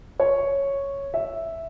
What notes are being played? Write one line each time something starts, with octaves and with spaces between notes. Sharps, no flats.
C#5
E5